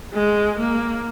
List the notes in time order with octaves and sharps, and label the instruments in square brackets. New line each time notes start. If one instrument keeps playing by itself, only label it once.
[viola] G#3
A#3